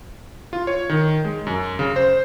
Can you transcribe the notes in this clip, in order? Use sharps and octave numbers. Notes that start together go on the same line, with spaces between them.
F4
C#5
D#3
G#3
F#2
C#3
C5